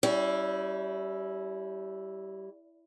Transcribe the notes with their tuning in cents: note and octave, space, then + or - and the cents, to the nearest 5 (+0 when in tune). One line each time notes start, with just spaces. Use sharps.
G3 -20 C#4 +25 E4 +0